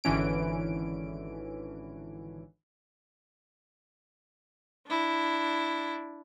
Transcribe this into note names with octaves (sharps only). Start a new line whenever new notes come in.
G#1 D3 E3 C#4 D7
D4 E4